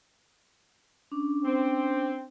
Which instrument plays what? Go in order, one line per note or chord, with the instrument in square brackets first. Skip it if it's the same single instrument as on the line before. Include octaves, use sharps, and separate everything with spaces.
[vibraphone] C#4 D4 D6
[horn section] C4